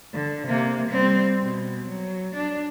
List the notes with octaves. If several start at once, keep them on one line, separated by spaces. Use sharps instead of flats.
D3
C3 A#3
G3 C4
B2
F#3
D4